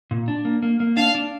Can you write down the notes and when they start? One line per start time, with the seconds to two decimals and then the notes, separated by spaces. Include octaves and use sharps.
0.11 A#2
0.28 D4
0.45 A#3
0.62 A#3
0.80 A#3
0.97 D4 F5
1.15 D4